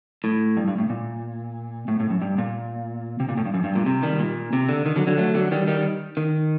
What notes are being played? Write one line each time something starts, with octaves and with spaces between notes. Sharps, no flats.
A2
G2
G2
A2
A#2
A2
A2
F#2
G2
A#2
C3
A#2
A2
G2
F#2
G2
A#2
C3
D#3 G3
A#2
C3
D3
D#3
D3 F#3
D3 F#3
F#3 A3
D3 F#3
D#3 G3
D#3 G3
D#3